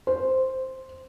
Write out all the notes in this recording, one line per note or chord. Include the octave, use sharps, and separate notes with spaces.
C5